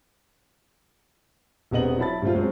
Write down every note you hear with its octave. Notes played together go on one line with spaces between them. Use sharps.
E1 C3 B3 D#5 F#7
F#3 E4 A5 B5 A6
G2 C3 A3 C4 F4
F#2 G#3 C4